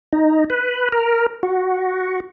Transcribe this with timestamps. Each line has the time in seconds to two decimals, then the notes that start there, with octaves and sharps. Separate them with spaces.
0.13 D#4
0.50 B4
0.92 A#4
1.43 F#4